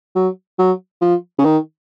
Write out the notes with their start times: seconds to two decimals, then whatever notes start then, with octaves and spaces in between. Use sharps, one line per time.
0.15 F#3
0.59 F#3
1.02 F3
1.38 C#3
1.45 D#3